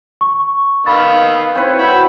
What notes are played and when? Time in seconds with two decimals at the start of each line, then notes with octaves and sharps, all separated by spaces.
0.21 C#6
0.86 D#3 B3 F5 B5 E6 A6
1.55 C4 E4 B4 C#5
1.79 F#4 E5 G5 B5